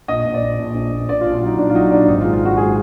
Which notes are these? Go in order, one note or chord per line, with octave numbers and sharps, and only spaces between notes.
A#1 D#5
A#1
D5
A#1
A#1
A#1
A#1
A#1 D5
F4
A#1
F4
F#3 D#4
A#1 D4
F4
F#3 D#4
A#1 D4
G#1 D#4
F4
G#3
F4
G#2 F#4
F#4
G#3 G#4